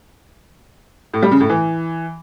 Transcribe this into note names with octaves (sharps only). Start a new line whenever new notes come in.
A2
G3
C#3
A2
E3